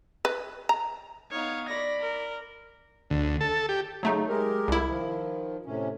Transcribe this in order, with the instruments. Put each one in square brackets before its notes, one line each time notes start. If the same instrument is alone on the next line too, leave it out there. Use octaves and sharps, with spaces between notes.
[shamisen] B4
A#5
[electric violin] B3 C#5 [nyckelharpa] D#4 F5
[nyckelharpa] D5 B5 [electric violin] A#6
[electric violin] A#4
[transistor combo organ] D2
A4
G4
[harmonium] C#3 [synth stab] F#3 A3 D#4
[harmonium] G#3 G4 A#4
[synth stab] C2 E4
[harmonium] D#3 F3
A2 C3 C#4